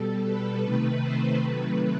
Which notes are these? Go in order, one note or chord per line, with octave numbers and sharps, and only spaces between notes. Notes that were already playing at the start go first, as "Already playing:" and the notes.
Already playing: B2 G3 A4
B4
C3 D#3 A3 B4
C5
C3 D#3 F#3 A3 B4